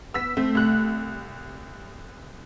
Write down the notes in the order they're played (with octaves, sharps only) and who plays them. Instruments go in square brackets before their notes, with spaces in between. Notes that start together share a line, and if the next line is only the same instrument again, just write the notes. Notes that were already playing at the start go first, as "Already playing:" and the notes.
[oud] B3 [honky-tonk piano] E6 B6
[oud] A3 [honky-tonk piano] C4
[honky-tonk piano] C2 F#6